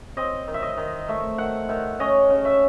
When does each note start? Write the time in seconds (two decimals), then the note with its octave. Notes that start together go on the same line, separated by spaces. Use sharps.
0.17 C4 D#5
0.48 D#3
0.54 E5
0.62 D#5
0.77 D#3
1.08 A3 E5
1.38 D#3 F#5
1.69 D#3 E5
2.00 C#4 D#5
2.30 C#3
2.45 E5